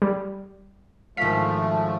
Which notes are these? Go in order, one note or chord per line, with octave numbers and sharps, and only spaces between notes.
G3
G#1 F3 A3 F5 B6